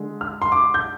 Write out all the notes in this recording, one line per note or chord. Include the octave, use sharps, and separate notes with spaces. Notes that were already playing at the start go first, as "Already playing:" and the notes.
Already playing: D3 G#3
F6
C6
D6
G6